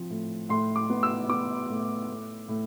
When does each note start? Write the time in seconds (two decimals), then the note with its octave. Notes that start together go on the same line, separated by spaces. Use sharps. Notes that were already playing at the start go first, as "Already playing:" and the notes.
Already playing: F3 C4
0.10 A2
0.49 A2 C6
0.76 D6
0.90 B3
1.03 E6
1.29 B3 D6
1.69 A2
2.08 A2
2.48 A2